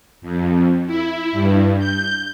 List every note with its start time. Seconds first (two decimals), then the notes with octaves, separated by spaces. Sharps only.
0.22 F2
0.87 E4
1.32 G2
1.79 G6